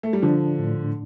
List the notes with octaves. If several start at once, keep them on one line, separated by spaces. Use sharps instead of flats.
A3
G3
D3 F3 D4
A2